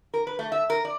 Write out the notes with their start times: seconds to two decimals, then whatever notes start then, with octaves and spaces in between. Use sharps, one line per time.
0.14 A#4
0.27 B4
0.39 A3
0.52 E5
0.70 A#4
0.85 D5